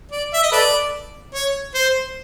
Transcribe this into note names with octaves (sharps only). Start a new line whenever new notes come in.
D5
E5
D#5
A4 B4 D5
C#5
C5